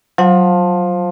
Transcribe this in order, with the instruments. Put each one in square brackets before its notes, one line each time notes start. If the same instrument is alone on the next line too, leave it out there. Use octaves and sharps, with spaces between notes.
[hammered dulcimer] F3 [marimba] F#3 F#5